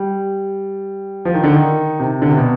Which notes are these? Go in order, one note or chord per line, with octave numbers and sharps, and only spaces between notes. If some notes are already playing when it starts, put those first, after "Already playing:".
Already playing: G3
F3
D#3
D3
D#3
C3
D3
C3
B2